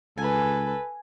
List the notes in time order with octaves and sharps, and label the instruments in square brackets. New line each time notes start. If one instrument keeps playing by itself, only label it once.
[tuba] C#2 [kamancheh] A4 B4 [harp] G#5